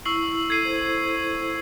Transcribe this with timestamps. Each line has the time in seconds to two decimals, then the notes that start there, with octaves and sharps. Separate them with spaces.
0.05 E4 C#6 E6 C7 F#7
0.50 A4 G#6 C7 D#7
0.65 C5